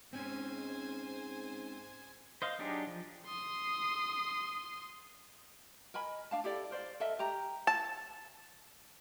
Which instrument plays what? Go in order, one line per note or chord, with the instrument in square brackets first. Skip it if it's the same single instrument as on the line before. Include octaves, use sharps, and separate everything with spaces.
[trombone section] G#2 [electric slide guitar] C4 C#4 [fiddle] C5 G#5
[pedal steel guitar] C5 D#5 F5
F#3 D4 D#4 G4 G#4
F3
[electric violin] C6 D#6
[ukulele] A#4 D#5 G#5 B5
D4 F5 A5
E4 G4 A4 D5
A#4 C5 D5
A4 A#4 D#5 E5
G4 A#5
[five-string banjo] A5